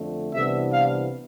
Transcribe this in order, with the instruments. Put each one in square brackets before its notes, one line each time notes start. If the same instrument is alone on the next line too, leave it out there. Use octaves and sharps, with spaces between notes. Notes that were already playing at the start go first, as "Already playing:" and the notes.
Already playing: [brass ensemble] F2 D3 A3
C2 C3 E3 B3 D4 E5
F5